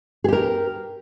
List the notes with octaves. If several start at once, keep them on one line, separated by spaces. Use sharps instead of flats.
G4 G#4 A#4